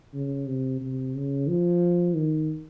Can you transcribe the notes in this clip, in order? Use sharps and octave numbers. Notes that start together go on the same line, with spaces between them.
C#3
C3
C3
C#3
F3
D#3